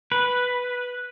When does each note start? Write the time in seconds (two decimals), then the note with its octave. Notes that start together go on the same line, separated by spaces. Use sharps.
0.12 B4